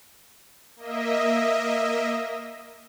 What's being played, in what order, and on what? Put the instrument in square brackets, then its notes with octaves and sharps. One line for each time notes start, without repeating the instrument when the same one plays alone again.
[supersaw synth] A#3 D#5 E5